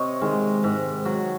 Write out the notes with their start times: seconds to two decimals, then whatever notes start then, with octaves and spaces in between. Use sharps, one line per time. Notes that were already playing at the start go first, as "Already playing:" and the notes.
Already playing: C3 C#5 D#5
0.21 D#3 G#3
0.64 G#2
1.05 F#3